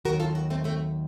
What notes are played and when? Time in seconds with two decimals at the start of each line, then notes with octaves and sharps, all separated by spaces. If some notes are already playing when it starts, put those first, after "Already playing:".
0.05 D#2 D#3 F#3 F#4 A#4
0.20 F4 A4
0.35 F#4 A#4
0.50 A3 C4
0.64 A3 C4